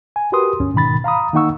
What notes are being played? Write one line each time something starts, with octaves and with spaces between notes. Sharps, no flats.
G#5
F#4 G4 A#4 B4 C6 D#6
D2 G2 C#4
G#2 B2 D#3 B5 A6
F5 A#5 B5 D#6
D#3 A#3 D#4 F#5 C#6 E6